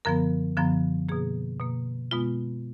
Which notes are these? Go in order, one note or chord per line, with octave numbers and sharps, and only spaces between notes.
F#2 D3 F3 B3 A#4
F#2 D3 F3 B3
B2 A#3 G#4
B2 A#3
B2 G#3 B3 F4